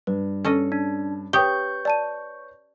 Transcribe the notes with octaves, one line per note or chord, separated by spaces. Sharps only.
G2 B4
C#4 A4 D#5
D4
G4 B4 C#5 G5 C#6 D#6 G6 G7
D5 A5 D#7